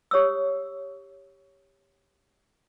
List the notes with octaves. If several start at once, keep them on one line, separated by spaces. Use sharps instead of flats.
G4 C#5 D#6 E6